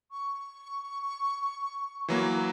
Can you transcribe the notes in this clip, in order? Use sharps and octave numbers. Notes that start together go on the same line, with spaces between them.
C#6
E3 F#3 A#3